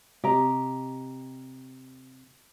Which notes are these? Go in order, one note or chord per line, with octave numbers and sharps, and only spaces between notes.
C3 G4 D#5 A#5